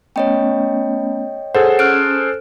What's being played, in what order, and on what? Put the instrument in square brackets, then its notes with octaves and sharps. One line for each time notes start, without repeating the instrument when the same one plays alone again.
[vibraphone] A3 B3 C#4 [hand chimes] C#5 D#5 G5
[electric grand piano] G#4 A4 C5 [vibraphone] C#5 [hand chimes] F#5
[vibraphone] C#4 [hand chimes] F6 F#6 D7